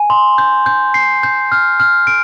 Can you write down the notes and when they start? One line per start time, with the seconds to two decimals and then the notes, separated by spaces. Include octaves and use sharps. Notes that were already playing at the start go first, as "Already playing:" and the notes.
Already playing: G#5
0.10 C6
0.38 G6
0.66 G6
0.94 C7
1.23 G6
1.52 F6
1.80 F6
2.07 D7